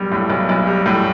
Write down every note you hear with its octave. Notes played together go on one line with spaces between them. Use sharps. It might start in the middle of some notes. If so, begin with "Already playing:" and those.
Already playing: B1 G3
A2
B1
B1
G3
A2